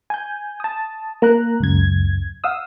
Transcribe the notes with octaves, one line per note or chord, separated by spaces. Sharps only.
G#5 G6
A5 D#6
A#3 A#5 F#6
C#2 F#2 G#6
F5 F#5 D#6 E6